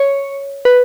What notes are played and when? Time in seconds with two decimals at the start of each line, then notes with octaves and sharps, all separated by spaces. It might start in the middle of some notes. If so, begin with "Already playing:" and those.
Already playing: C#5
0.65 B4